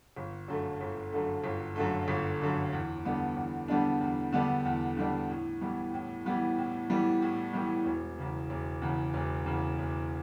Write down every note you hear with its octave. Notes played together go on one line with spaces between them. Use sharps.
G1
F#2 D3 A3
G1
F#2 D3 A3
G1
F#2 D3 A3
G1
F#2 D3 A3
E2
D3 G3 B3 D4
E2
D3 G3 B3 D4
E2
D3 G3 B3 D4
E2
D3 G3 B3 D4
A2
E3 G3 B3
A2
E3 G3 B3
A2
E3 G3 B3
A2
E3 G3 B3
E1
E2 C#3
E1
E2 C#3
E1
E2 C#3
E1